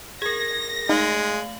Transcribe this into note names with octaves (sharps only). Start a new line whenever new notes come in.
G#4 A#4 G#6 A#6
G#3 A3 D#4 F5 F#7